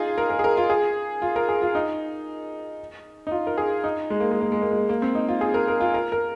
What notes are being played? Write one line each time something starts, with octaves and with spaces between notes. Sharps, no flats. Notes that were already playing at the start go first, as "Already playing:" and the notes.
Already playing: D#4 F4 G#4
A#4
A#4
G#4
A#4
F4
G#4
F4
A#4
G#4
F4
D#4
D#4
F4
A#4
G#4
D#4
G#3
A#3
G#3
A#3
G#3
A#3
G#3
A#3
C4
D#4
F4
G#4
A#4
A#4
F4
A#4
A#4